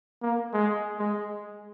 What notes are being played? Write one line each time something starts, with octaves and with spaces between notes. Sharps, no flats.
A#3
G#3
G#3